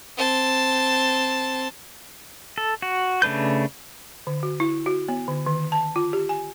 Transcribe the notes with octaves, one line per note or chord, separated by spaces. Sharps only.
C4 A5
A4
F#4
C#3 A3 D4 B4 G6
D3
F#4
E4
F#4
B3
D3
D#3
A5
F4
G4
G#5